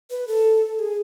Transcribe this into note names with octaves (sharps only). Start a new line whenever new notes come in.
B4
A4
G#4